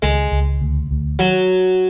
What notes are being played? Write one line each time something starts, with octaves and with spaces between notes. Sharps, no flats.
C#2 G#3
C#2
D2
D2
F#3